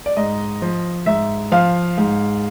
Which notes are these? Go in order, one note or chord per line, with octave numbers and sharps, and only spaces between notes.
D5
G#2 D#5
F3
G#2 E5
F3 F5
G#2